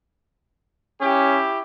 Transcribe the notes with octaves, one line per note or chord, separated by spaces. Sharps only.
C#4 E4 G4